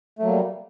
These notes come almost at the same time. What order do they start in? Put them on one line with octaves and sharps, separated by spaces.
A3 F#3 A#3 G3